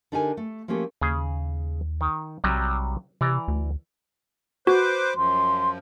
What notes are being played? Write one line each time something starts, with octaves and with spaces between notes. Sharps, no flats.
D3 D4 D#4 G4 A#4 G#5
A3
F3 A3 A#3 C#4 G4
D#2 C#3 G#4
D#3
B1 C3 F#3 G3
C3 E3 D5 A#5
D2
F#4 B4 C5 D6
F#2 F3 C6